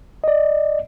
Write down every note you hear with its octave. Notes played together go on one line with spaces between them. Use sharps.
D5 D#5